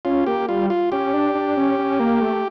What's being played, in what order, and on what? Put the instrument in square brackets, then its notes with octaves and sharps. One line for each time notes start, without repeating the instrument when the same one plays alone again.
[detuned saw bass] C#4 [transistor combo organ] F4
[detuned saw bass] A#3 [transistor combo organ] G4
[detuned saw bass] G3 [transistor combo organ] F4
[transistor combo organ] F4
[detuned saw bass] C#4 [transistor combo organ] G4
[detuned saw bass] D4
D4
C#4
C#4
A#3
A3